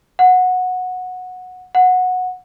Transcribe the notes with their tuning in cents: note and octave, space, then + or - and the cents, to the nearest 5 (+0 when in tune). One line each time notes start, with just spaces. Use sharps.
F#5 -15
F#5 -15